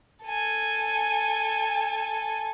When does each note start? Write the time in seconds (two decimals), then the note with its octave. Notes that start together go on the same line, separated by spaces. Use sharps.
0.24 A4 G#5